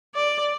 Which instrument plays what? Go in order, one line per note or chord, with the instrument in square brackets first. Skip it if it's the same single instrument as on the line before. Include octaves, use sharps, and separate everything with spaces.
[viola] D5